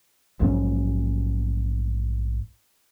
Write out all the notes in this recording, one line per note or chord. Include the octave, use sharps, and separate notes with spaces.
A#1 G#2 F#3 C#4